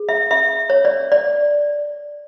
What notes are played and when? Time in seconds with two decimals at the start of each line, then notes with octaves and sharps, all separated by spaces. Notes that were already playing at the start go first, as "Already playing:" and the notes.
Already playing: G#4
0.09 E5
0.31 E5
0.70 C#5
0.85 D5
1.12 D5